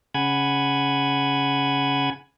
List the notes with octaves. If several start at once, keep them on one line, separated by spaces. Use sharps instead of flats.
C#3 F#5 G#5 B5 G#6